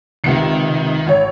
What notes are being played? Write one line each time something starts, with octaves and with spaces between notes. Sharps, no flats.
C#2 C3 D#3 C#7
G#1 C#5